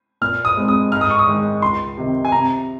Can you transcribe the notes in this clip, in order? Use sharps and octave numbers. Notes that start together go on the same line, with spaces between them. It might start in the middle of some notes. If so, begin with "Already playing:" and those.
A#2 F6
D#6
G#3 C4 D#4
D#6
G#2 F6
D#6
C#6
D#6
D#3 G#3 D#4
C#2 C6
C3 D#3
G#5
C3 A#5